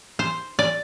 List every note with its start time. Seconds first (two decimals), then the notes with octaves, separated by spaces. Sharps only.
0.19 C5
0.59 D5